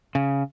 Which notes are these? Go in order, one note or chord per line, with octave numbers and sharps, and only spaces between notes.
C#3